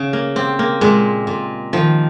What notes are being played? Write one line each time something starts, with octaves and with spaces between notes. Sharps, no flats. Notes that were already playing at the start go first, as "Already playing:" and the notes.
Already playing: C#3
A#3
C4 G4
A#3
A#2 G#3
A#2
D#3 F3